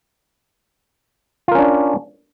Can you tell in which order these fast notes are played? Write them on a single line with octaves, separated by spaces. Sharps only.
F4 A#4 C#4 D4